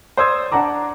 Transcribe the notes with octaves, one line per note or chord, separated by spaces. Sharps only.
C5 D5 C6 D#6 E6 G#6
D4 F#5 A5 A#5 D6